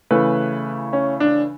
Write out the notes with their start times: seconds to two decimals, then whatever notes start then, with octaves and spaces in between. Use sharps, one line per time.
0.11 C#3 E3 A3 B4
0.93 C#4
1.20 D4